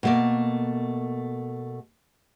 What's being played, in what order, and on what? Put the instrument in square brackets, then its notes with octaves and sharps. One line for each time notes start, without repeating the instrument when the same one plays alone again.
[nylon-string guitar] B2 A3 A#3